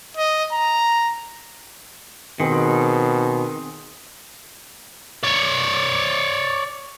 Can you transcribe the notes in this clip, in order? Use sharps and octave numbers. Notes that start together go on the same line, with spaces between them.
D#5
A#5
B2 D#3 C4 G#4
C#5 D5